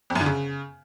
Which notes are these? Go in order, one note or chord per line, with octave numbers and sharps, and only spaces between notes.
F2
F#2
D3
C#3